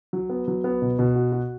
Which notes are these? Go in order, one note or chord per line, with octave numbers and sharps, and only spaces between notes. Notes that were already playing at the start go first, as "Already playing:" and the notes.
F#3
B3
F#3
B3
B2
B2
F#4
F#4